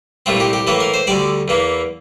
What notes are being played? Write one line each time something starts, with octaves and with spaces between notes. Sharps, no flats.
C2 A#2 A3 C4 F4
G4
G4
A2 E3 A#3 A4
A#4
C5
D2 D3 G3 D5
E2 E3 A#3